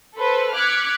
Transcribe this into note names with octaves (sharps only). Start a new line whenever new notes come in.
A4 B4 C5
D6 F6 F#6 G#6 B6 C#7